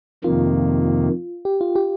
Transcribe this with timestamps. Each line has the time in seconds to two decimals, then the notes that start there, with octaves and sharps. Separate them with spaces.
0.24 F2 C3 D#3 A#3 F4
1.45 G4
1.61 F4
1.76 G4